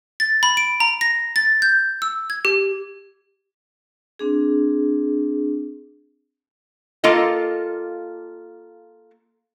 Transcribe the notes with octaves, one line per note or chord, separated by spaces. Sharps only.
A6
B5
D7
A#5
A#6
A6
G6
E6
G#6
G4
C4 D4 G#4
A#3 F4 A4 D#5